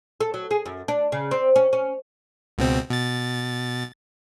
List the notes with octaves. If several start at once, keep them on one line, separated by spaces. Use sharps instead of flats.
A4
F#3
G#4
F#2
D4
C#3
C4
C#4
C#4
C#2 B2 C4
B2 A6